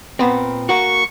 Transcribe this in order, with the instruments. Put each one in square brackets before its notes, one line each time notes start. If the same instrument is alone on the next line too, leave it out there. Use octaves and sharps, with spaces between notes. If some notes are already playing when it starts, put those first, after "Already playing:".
[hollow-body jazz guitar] A#2 B3 C4
[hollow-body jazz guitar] A#3 F#4 [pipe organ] C#6